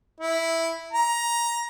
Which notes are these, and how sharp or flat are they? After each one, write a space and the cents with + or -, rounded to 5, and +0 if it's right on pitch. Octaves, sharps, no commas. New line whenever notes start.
E4 -5
A#5 +15